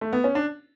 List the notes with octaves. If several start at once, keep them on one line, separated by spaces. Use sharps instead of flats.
A3
B3
C#4
D4